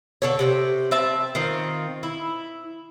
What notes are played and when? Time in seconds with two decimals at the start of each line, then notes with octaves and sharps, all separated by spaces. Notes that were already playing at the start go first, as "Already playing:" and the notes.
0.22 D3 A4 C#5
0.39 C3 G#4 G5
0.91 C4 E5 A5
1.35 D#3 C4 F4
2.03 E4